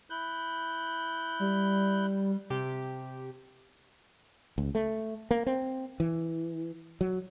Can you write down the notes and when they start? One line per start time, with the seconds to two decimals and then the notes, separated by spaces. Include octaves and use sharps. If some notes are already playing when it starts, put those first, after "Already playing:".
0.10 E4 F#6 G6
1.40 G3
2.50 C3 G4
4.58 C#2
4.75 A3
5.31 A#3
5.47 C4
6.00 E3
7.01 F#3